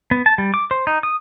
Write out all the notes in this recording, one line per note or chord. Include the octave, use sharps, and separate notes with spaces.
B3
A5
G3
D6
C5
D#4
D#6